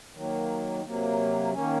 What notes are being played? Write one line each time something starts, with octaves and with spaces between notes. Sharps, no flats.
D#3 F#3 A#3
C3 F#3 A#3
D#3 A#3 C#4